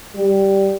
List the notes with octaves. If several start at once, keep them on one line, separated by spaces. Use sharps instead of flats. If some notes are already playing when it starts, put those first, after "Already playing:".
G3